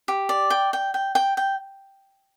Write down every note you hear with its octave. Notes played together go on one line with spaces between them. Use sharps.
G4
D5
G5
G5
G5
G5
G5